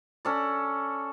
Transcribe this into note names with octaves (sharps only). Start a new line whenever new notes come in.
C#4 A4 D5